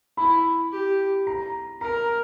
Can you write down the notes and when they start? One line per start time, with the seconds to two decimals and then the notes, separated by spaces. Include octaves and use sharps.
0.17 E4 B5
0.72 G4
1.27 A#5
1.81 A#4 A#5